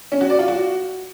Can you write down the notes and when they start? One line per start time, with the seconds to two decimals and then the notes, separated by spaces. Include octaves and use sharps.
0.12 C#4
0.21 F#4
0.30 D5
0.39 F4
0.48 F#4